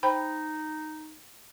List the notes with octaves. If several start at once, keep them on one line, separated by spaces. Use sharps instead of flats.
D#4 C5 G5 B5